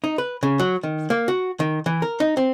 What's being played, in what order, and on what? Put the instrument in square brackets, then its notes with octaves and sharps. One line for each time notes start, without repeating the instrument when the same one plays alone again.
[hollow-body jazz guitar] D#4
B4
C#3
F#3
D#3
A#3
F#4
D#3
E3
A#4
D#4
C4